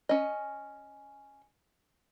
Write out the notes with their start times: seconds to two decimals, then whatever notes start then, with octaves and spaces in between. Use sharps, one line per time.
0.09 C#4 D#5